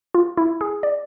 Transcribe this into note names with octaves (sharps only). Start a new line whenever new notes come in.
F4
E4
G#4
D5